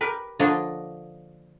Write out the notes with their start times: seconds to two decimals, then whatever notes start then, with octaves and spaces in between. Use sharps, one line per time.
0.01 G4 A#4 B4
0.39 D3 F3 A#3 D4 C#5 D#5